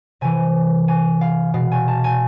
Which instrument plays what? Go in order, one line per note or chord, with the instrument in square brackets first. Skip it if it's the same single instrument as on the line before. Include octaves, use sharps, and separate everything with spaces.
[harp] C3 E3 G#5
G#5
F5
B2 F5
G#5
A5
G#5